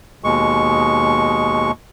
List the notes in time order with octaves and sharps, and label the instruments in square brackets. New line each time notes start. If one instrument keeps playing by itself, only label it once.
[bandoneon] D#2 B2 G#3 C#6